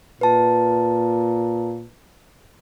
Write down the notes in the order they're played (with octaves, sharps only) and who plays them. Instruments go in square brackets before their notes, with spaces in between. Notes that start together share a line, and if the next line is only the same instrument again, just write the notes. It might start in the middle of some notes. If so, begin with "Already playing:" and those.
[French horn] A#2 [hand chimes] B4 A5